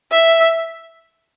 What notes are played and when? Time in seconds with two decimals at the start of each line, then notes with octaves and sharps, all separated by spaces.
0.12 E5